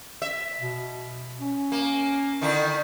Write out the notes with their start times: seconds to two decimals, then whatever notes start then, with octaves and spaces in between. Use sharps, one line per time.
0.22 E5
0.60 B2
1.41 C#4
1.72 A#3
2.41 D3 D#3 E4